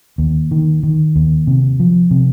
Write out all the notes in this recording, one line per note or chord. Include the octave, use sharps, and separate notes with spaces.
D#2
D#3
D#3
D#2
C3
F3
C3